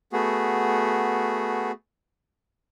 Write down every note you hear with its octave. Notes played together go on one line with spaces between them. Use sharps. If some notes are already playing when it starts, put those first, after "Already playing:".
A3 B3 F#4 G#4